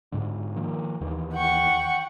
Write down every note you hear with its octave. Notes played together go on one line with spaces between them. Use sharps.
G#2 D3
D#3 F3 A#3
D#2 D#3 E3
F#5 G5 C#6